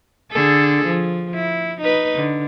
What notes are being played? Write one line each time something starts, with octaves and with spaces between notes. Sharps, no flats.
D3 G#4 A4
F3
E4
D#4 B4
D3